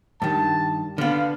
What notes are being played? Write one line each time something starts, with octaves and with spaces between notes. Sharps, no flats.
G2 D#3 A5
D3 B3 F5